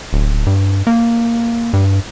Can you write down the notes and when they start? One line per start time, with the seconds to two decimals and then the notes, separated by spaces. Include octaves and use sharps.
0.13 D1
0.47 G2
0.87 A#3
1.73 G2